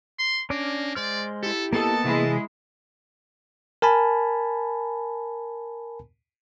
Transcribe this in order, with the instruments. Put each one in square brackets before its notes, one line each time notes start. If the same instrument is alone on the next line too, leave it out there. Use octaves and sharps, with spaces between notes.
[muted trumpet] C6
[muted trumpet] A#3 [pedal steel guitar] C#4 D4 D5
[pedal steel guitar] G#3 C5 F6 [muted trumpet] D5
[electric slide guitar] E4 G4 [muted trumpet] A4
[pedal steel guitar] A#3 B3 D#5 [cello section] A4 [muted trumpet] A5
[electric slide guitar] C3 E3 G#4 [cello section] G#3 E4
[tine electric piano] A#4 G#5 A5 B5